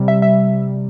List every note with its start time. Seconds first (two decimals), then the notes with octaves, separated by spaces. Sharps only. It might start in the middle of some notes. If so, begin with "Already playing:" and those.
Already playing: C3 G3
0.08 E5
0.22 E5